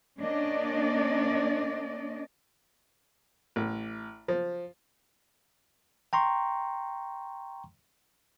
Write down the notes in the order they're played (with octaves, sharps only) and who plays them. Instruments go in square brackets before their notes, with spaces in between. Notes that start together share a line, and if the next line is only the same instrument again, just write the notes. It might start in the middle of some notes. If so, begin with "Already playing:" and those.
[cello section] A#3 C#4 D4 D5 D#5
[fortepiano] A1
F3
[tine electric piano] G5 A#5 C6 C#6